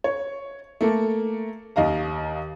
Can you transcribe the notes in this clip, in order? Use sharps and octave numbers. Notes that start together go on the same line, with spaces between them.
C#5
A3 A#3 A4
D#2 D#5 F5 A#5